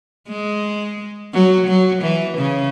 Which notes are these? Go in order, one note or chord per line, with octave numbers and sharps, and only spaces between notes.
G#3
F#3
F#3
E3
C#3